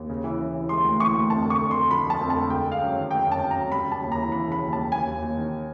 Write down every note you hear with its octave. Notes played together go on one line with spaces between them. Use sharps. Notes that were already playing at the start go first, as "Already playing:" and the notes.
Already playing: D#2
C#3
E3
C#3
E3
G#3 C6
D2
E3 C#6
D2
F2 A5
D3
C#6
F2
D3 C6
F3 B5
F3 A5
F2
A5
D3
G#3 G5
G#3
F5
F#2
D#3
G#3 G5
F#2
A5
F#2
A#5
F#2
G3 B5
C#3 A5
D#2
A#5
E3
E3 B5
C#3 B5
D#2
G3 A5
D#2 G#5
D#2
D#2
D#3